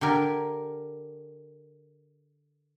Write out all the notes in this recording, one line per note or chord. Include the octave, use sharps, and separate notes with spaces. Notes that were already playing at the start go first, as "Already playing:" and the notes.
D3 G4 A#4 G#5